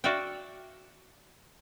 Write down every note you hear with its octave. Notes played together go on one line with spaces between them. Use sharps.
F#4 D5 E5 F5 G5